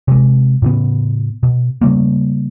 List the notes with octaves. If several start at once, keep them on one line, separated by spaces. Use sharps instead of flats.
C3 G#3
A2 C#3 B3
B2
C#3 G3 A3 A#3